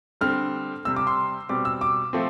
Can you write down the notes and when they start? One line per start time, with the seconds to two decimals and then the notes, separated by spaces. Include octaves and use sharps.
0.21 D3 G3 C4 F6
0.85 C3 G3 C4 E6
0.96 D6
1.07 C6
1.49 B2 G3 C4 D6
1.65 E6
1.81 D6
2.13 F3 A3 C4